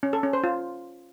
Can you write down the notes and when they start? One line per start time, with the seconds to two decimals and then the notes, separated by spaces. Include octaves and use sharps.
0.03 C#4
0.13 A4
0.23 C#4
0.33 C5
0.44 F4